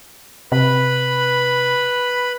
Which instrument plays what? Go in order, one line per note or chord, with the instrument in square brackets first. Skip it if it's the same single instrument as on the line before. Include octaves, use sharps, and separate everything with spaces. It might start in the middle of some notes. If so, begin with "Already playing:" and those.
[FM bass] C3 [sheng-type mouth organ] B4 B5